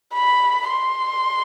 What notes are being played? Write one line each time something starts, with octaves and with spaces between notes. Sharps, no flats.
B5
C6